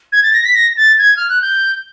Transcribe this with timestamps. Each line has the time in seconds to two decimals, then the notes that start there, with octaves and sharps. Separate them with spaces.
0.12 G#6
0.23 A6
0.34 A#6
0.45 B6
0.55 A#6
0.77 A6
0.98 G#6
1.17 F6
1.29 F#6
1.42 G6